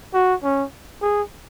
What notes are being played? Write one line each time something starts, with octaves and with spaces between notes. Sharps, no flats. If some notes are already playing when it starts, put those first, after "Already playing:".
F#4
C#4
G#4